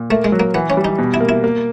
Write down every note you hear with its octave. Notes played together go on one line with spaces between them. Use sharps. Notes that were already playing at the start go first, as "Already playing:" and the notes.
Already playing: A#2
A3 A#3
G#3
F#3
A#3
E3 B3
C#4
G3
D#4
B2
E4
A#3
E4
A#3